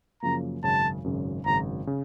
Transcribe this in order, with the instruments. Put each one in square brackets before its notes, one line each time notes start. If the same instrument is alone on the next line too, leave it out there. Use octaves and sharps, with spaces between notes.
[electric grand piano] F#2 C#3 F3 A#3 [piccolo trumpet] A#5
[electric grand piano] G#1 F#2 C#3 [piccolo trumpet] A5
[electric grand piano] G#1 F#2 C#3
[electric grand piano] G#1 F#2 C#3 [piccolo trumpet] A#5
[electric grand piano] C#3